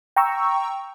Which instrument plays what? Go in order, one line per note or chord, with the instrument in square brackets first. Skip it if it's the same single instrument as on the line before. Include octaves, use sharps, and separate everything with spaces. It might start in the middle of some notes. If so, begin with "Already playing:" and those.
[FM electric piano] G5 A#5 C#6 E6